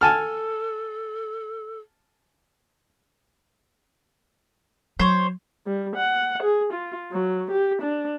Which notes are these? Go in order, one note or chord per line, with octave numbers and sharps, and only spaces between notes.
A4 G#5 A5 F6
F#3 C5 C#5
G3
F#5
G#4
F4
F#3
G4
D4